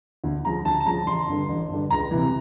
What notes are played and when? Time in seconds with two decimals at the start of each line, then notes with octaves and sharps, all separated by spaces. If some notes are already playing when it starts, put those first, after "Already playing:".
0.24 D2
0.45 C#3 F3 A#5
0.65 D2 A5
0.81 A5
0.86 C#3 F3 A#5
1.07 A1 C6
1.28 G2 D3
1.49 A1
1.69 G2 D3
1.90 C#2 A#5
2.11 C3 E3